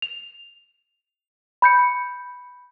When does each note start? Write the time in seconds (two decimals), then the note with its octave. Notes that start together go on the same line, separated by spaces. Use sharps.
0.02 F7
1.62 B5 G6 C#7